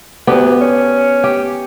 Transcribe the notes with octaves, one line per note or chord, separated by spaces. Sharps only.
D2 B3 G4
C#4
G4